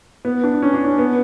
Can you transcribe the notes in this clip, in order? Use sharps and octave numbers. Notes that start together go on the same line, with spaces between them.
B3
D4
C#4
D4
C#4
B3